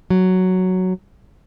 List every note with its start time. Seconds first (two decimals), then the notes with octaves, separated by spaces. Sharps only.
0.10 F#3